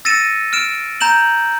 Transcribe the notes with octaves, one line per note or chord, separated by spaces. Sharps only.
E6 A6 A#6 C#7 D#7 E7
F6 D7 E7
A#5 G6 E7 F#7